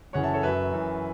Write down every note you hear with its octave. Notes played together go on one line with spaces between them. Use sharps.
F#2 C#3 E3 C#5 F#5
E5 A5
A4 C#5
F#2 F#3 B4 E5
F#2 E3